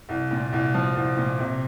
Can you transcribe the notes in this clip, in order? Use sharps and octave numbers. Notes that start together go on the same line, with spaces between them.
C2
A#2
C2
F3
C2
A#2
C3